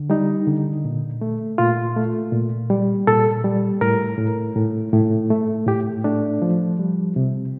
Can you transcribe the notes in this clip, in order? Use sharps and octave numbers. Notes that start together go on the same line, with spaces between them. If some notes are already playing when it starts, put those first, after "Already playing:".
Already playing: D3
G3 D#4
D3
A#2
A3
A#2 F4
A3
A#2
G3
A#2 A4
G3
A2 A#4
A2
A2
A2
A3
A2 G4
A3 D4
F3
G3
C3